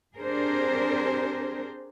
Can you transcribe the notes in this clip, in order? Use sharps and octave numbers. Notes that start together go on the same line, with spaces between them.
C4 D4 G4 G#4 A#4 C5